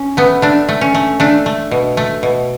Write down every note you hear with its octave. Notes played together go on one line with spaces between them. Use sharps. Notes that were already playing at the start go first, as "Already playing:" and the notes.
Already playing: C#4
A3 B3
A3 D4
A3
C#4
A3
A3 D4
A3
B2
A3
B2